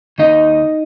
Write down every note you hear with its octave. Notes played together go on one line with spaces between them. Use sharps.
D#2 D#3 D#4 D#5